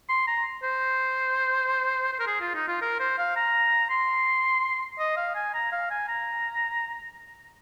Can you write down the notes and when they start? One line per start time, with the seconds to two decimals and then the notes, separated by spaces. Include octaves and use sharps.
0.09 C6
0.27 A#5
0.63 C5
2.13 C5
2.19 A#4
2.27 G#4
2.41 F4
2.54 D#4
2.68 F4
2.81 A#4
2.99 C5
3.18 F5
3.36 A#5
3.90 C6
4.99 D#5
5.17 F5
5.35 G#5
5.54 A#5
5.72 F5
5.90 G#5
6.08 A#5